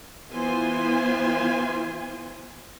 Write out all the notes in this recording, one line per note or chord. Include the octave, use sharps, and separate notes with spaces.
E3 B3 F4 C5 G#5 C6